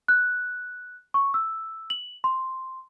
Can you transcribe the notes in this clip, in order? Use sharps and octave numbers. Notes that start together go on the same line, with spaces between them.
F#6
C#6
E6
F#7
C6